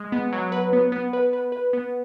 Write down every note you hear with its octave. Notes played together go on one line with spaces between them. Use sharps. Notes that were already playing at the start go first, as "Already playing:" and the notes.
Already playing: G#3
B3
F#3
B4
B3
B3
B4
B4
B4
B3